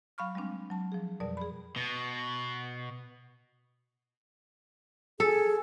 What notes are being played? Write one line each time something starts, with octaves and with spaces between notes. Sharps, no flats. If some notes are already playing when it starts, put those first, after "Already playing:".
F#3 F5 B5 C#6 F6
G3 G#3 C4 D4
F#3 A5
F3 G#4
F2 B2 G3 A#4 D5
G#4 B5
B2
G#4 A4